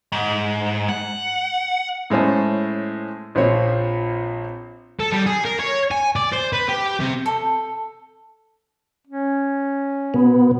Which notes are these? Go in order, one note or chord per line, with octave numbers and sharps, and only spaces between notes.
G#2
F#5
A2 G#3 C#4 C5 A5
A#1 A#2 F3 C4 C#5
A4
G3
G#4
A#4
C#5
G#5
D5
C5
B4
G4
C3
A4
C#4
B2 B3